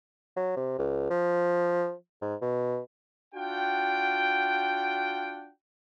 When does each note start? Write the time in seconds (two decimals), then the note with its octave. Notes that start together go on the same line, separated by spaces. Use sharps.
0.36 F#3
0.56 C3
0.79 C#2
1.10 F3
2.22 G#2
2.42 B2
3.35 D4 F4 F#4 F#5 G5